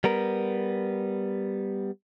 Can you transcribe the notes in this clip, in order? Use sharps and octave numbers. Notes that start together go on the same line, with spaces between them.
G3 B3 A#4